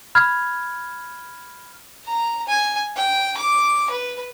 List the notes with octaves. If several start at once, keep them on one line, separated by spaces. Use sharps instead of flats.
B5 F6 G#6
A#5
G#5
G5
D6
B4